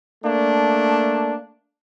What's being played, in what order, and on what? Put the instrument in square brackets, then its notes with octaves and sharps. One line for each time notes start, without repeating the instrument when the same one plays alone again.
[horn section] A3 A#3 D4